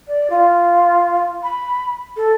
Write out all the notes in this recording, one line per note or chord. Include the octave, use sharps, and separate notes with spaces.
D5
F4
B5
A4